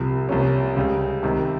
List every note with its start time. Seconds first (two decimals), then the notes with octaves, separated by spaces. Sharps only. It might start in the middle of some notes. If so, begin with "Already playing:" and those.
Already playing: C2 C3 F3
0.29 C2 C3 F3 A#3 C#4
0.76 C#2 C#3 G3
1.23 C2 C3 D#3